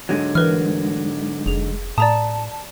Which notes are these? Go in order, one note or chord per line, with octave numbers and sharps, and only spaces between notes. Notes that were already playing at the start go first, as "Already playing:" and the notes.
G#2 D3 F#3
E3 A#4 B4 F6
F1 G#4 F7
A2 D5 A5 A#5 D#6